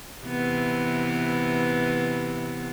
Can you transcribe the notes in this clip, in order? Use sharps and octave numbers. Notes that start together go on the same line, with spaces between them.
C3 E3 B3